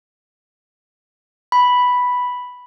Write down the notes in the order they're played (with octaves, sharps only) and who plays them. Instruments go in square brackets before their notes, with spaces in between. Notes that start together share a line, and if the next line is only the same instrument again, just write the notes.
[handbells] B5